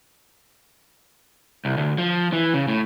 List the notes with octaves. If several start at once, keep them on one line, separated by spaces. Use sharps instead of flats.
C2
D2
F3
E3
C#3
A2